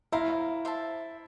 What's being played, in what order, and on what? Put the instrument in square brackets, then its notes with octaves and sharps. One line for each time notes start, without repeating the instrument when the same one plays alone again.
[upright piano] E4 [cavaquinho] C5 F5 A#5
[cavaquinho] C5 E5 A5